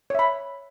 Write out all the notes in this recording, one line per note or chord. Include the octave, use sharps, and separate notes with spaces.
C#5 E5 B5